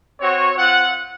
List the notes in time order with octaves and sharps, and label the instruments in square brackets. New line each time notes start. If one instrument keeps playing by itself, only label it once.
[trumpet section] C4 F#4 C#5
C4 F4 F#5